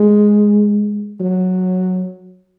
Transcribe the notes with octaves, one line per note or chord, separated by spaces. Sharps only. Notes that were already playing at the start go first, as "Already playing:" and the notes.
Already playing: G#3
F#3